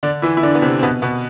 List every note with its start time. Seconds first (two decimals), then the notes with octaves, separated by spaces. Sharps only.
0.03 D3 D4
0.22 E3 E4
0.37 E4
0.43 D3 D4
0.55 B3
0.62 C3 C4
0.79 C4
0.83 B2 B3
1.02 B2 B3